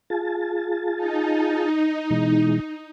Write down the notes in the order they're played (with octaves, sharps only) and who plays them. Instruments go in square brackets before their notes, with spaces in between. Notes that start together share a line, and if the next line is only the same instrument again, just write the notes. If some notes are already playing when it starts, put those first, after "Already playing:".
[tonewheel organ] F4 G#4 A5
[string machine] D#4
[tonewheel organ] B2 E3 G#3